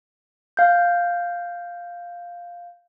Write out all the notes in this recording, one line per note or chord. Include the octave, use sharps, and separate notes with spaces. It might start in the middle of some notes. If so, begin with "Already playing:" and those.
F5 G6